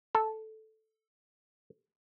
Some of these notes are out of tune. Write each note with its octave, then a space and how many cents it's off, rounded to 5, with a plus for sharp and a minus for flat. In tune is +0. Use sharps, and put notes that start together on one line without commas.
A4 -5